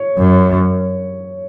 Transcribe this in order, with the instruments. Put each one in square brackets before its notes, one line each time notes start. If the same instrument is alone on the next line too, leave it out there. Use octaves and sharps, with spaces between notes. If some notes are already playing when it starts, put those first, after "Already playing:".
Already playing: [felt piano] C#5
[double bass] F#2